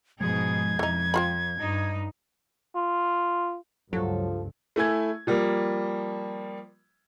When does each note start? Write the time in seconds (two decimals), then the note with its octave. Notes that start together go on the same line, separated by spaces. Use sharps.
0.21 G#2 B2 F3 G#3 G#4 G#6
0.79 F2 E3 D#4
1.14 C4 F4 B5
1.58 G2 D#4
2.75 F4
3.93 C#2 G2 F3 F#3 A4
4.76 A3 E4 G#5 G#6
5.27 F3 G3 A#3